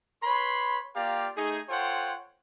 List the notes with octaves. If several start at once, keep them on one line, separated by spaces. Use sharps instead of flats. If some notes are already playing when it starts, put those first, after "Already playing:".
B4 C#5 B5 C6
A#3 F4 G4 D5 F5 A#5
A3 D#4 G#4
F4 A4 C5 C#5 F#5 G5